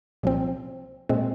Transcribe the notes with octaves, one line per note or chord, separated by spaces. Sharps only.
C2 A#2 F3 C4
A#2 G#3 C4